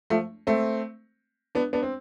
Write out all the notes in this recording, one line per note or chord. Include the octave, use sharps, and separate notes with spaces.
F3 A3
A3 C4
B3 D4
B3 D4
C4